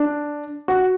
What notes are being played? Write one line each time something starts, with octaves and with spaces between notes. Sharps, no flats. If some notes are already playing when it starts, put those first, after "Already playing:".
Already playing: D4
F#4